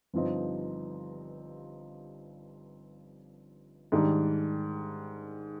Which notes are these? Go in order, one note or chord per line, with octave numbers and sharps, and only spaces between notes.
G1 G2 F3 C4 D#4
G#2 D#3 G3 D4